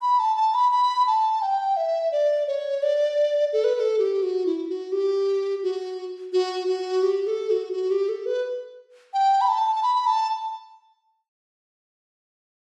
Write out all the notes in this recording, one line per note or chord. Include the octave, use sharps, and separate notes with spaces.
B5
A5
A5
B5
B5
A5
G5
E5
D5
C#5
D5
A4
B4
B4
A4
G4
F#4
E4
F#4
G4
F#4
F#4
F#4
G4
A4
F#4
F#4
G4
A4
B4
G5
B5
A5
A5
B5
A5